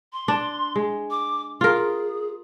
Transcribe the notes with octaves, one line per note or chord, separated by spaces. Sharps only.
C6
D4
G#3
D6
F4 G#4 A#4